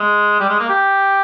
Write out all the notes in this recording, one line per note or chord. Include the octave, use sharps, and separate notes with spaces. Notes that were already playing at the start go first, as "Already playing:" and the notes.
Already playing: G#3
G3
G#3
A#3
G4